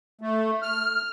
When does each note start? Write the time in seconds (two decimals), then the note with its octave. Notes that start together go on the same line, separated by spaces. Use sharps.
0.21 A3
0.62 F6